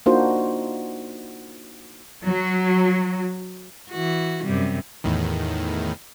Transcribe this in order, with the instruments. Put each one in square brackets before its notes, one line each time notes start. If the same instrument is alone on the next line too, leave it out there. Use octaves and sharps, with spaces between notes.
[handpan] A#3 D4 D#4 F4 F#4 C5
[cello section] F#3
[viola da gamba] E3 F#4
F#2 C3 G3
[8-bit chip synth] E2 A2 D#3